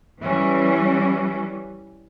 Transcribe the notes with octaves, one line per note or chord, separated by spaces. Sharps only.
E3 G3 C#4